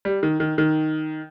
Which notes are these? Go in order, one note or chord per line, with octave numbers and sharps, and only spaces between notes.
G3
D#3
D#3
D#3